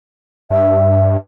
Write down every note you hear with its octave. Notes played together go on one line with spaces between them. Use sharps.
G2 E5